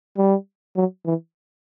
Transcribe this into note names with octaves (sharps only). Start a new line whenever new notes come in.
G3
F#3
E3